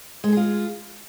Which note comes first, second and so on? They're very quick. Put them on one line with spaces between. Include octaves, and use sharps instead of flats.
G#3 A4 G#4 F4